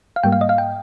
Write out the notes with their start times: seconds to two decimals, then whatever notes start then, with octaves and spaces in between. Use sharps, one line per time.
0.16 F5
0.23 G#2 G3 A#3 G5
0.32 F5
0.41 D#5
0.49 F5
0.58 G5